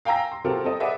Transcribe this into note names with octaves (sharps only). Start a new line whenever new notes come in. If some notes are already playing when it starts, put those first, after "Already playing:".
F5 G5 G#5 A#5 E6 A#6
C6
C3 C4 F4 F#4 A4 A#4
C4 A4 D#5
G#4 B4 D5 E5 F#5